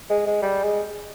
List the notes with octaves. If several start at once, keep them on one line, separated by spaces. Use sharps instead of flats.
G#3
G#3
G3
G#3